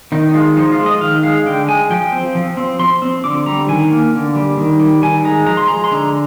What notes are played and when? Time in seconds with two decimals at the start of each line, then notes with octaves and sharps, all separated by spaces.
0.12 D#3 D#4
0.29 D#4
0.34 G#3 F4
0.57 F3 D#4
0.72 F4
0.79 G#3
0.86 D#5
1.01 D#3 F5
1.23 G#3 F5
1.46 D3 G5
1.68 G#3 G#5
1.90 F3 G5
2.12 C4
2.35 F3
2.57 C4
2.79 F3 C6
3.02 C4
3.24 D3 D6
3.46 G3 A#5
3.68 D#3 G#5
3.91 A#3
4.13 D3
4.36 G3
4.57 D#3
4.80 G3
5.02 D#3 G#5
5.25 G#3 A#5
5.47 F3 A#5
5.57 C6
5.68 G#3 A#5
5.84 C6
5.91 D3 A#5